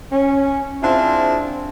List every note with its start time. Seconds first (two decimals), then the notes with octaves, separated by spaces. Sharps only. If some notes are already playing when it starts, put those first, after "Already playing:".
0.11 C#4
0.82 C4 D4 E4 F4 G#4 C5